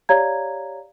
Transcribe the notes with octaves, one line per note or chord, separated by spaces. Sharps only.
G4 C#5 D5 F5 A#5 G#6